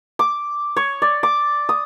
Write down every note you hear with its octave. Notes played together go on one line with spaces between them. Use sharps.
D6
C#5
D5
D6
D#6